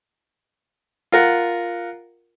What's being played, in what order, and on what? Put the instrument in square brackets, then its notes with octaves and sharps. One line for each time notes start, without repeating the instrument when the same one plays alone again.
[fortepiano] F4 A#4 F#5